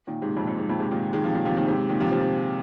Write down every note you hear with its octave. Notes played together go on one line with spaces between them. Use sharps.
A#2 D#3
G#2 C3
F2 A#2
F2
G#2
F2 A#2
G#2 C3
A#2 D#3
D#3 G#3
C3 F3
A#2 D#3
C3 F3
A#2 D#3
G#2 C3
A#2 D#3
C3 F3
C3 F3